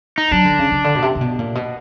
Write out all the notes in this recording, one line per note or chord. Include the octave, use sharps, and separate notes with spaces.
D#4
F#3 D4
D3
C#3
C#3
D3
B2
C3
C3
B2
A#2
B2